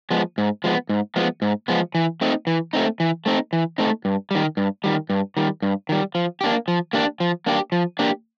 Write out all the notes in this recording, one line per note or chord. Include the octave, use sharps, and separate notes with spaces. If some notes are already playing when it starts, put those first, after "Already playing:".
F3 G#3 B3
G#2
F3 G#3 B3
G#2
F3 G#3 B3
G#2
F3 G#3 B3
E3
A3 C4 D#4
E3
A3 C4 D#4
E3
A3 C4 D#4
E3
A3 C4 D#4
G2
D#3 G3
G2
D#3 G3
G2
D#3 G3
G2
D#3 G3
F3
A#3 D4 G4
F3
A#3 D4 G4
F3
A#3 D4 G4
F3
A#3 D4 G4